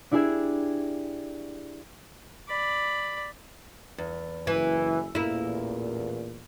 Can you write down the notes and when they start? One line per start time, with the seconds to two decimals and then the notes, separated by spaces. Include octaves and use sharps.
0.11 D4 E4 G4 G#4 D5 E5
2.48 D5 B5
3.98 E2
4.47 F#1 E3 E4 G#5
5.15 A1 E2 A#2 A#3 E4